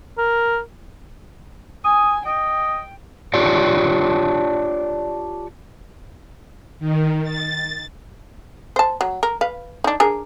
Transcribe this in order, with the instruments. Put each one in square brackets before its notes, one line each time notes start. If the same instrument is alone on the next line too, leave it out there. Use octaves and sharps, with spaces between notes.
[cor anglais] A#4
[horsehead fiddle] G#5 [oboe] D#6
[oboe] D#5 [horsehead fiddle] G5
[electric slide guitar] D4 F4 G4 C#5 D5
[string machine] D#3
A6
[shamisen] C5 A5
F#3
A#4
B4 F5
D4 D#4
D4 G#4 A#4